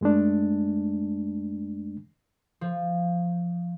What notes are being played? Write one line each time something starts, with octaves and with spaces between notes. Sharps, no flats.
F#2 G#3 A3 D4
F3